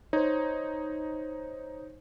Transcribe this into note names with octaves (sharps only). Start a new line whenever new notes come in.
D#4 C5 C#5